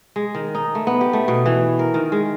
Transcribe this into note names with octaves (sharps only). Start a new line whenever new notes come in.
G#3
D#3
D#4
A3
B3
G4
A3
B2
E3
A#4
D#3
G#3